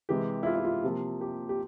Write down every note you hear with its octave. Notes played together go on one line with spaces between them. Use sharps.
C3 E3 G#3 G4
E4
F4
E4
F4
C3 F3 A#3
G4
G4